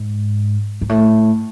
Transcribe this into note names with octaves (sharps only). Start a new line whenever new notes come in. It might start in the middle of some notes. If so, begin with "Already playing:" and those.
Already playing: G#2
G#2
A2